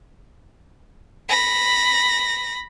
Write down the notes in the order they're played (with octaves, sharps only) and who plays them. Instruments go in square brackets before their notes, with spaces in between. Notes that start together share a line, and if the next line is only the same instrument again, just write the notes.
[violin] B5 A#6